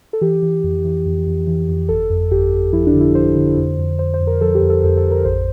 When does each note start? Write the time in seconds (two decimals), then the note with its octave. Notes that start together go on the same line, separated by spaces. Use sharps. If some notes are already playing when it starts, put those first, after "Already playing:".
0.13 A4
0.21 E3 G4
0.42 E3
0.64 F2
0.85 E3
1.06 F2
1.26 F2
1.47 E3
1.68 F2
1.89 G1 A4
2.10 F2
2.31 G1 G4
2.53 G1
2.73 F3 E4
2.87 D4
2.94 D3
3.01 E4
3.15 F3 C5
3.36 D3
3.57 F2
3.79 F2
3.99 F2 C5
4.14 C5
4.20 F2
4.27 A#4
4.41 F3 A4
4.55 G4
4.62 F2
4.70 A4
4.83 F2 A4
4.97 A4
5.04 F2
5.11 A#4
5.25 A1 C5